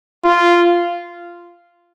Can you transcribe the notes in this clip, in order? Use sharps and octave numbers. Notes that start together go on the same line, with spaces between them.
F4